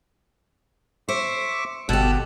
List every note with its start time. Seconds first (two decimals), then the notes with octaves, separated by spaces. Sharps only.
1.09 C5 E5 C#6 D6
1.89 G1 B2 G4 A4 E6 F#6